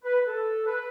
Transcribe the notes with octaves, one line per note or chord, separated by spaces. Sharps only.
B4
A4
B4